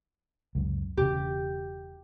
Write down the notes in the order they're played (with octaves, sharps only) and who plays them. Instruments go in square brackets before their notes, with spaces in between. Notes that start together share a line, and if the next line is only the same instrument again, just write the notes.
[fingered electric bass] C#2 F#2
[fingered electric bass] E1 C#3 [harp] G4